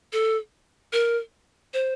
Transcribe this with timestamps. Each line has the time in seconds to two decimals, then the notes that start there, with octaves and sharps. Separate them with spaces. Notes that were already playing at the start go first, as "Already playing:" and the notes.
0.13 A4
0.93 A#4
1.74 C5